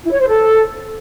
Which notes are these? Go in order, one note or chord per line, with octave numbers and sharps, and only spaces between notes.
E4
C#5
C5
A4